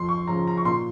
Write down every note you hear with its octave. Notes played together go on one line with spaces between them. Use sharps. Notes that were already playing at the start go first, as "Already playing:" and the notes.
Already playing: F2 C6
C#6
C#3 F3 A#5
A#5
C#6
A#2 C6